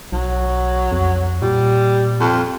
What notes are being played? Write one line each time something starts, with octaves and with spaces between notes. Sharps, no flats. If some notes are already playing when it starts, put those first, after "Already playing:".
B1 F#3
F2
A#2 G3
F2